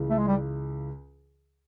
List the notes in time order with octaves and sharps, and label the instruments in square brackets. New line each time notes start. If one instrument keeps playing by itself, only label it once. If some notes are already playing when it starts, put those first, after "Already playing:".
Already playing: [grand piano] C#2 C#3 E3
[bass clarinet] A3
G#3
G3